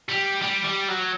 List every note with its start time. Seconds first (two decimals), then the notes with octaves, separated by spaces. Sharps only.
0.09 G3
0.42 G3
0.65 G3
0.88 F#3